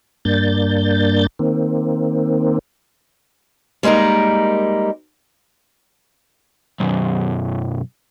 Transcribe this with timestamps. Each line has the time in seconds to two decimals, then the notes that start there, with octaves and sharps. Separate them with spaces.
0.25 G2 A#3 D4 G6 A6
1.39 D#3 A#3 C4
3.83 G3 G#3 A#3 D#4 A#4
6.80 B1 F#2